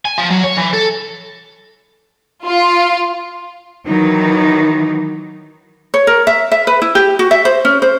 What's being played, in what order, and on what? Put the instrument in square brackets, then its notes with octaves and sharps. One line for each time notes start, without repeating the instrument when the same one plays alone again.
[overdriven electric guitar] G#5
F3
F#3
C#5
E3
A4
[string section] F4
[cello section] D#3 E3 F#3 D#4
[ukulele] C#5
A#4
E5
E5
B4
E4
G4
F#4
E5
C5
C#4
C5